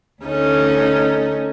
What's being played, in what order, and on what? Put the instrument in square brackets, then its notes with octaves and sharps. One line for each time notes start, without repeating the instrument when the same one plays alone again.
[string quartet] D2 C#4 D#4 A4